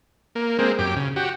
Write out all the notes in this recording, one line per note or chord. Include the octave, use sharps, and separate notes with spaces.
A#3
G#3 A#3 C4
F#2 G4 D6
C#3
F#4 G4